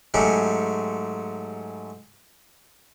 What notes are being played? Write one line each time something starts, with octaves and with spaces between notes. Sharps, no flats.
G#2 F#3 G#3 A3 C#4 G4